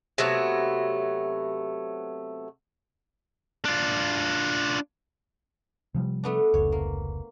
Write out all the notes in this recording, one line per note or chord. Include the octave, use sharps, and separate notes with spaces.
C3 F#3 A3 B3
D4 F4
C3 F3 G3
A3 B3 D4
F1 C#2 C#5
A#3